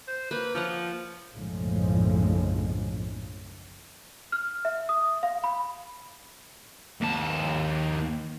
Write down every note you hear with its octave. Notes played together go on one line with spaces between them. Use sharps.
C5
A#3 B4
F3 F4 C#5 F#5
F#1 B1 A2 D3 F3 G#3
F6
E5
D#6
F5
B5
D#2 A5